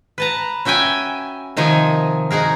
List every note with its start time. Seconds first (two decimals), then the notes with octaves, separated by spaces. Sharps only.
0.18 B4 A5 A#5
0.65 C#4 F#4 E5 G5 G#5
1.57 C3 D#3 F3 D#4 G#5
2.31 D#4 F#4 G#4 A#4